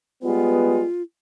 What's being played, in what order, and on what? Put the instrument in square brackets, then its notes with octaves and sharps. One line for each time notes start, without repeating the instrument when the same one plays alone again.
[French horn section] G3 G#3 B3 [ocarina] F4